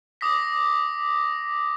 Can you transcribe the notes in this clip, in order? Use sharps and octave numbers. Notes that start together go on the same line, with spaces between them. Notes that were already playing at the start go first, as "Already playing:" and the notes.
D6 D#6 A#6 B6